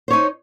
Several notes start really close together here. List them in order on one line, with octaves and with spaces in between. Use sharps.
C5 C#5 D#4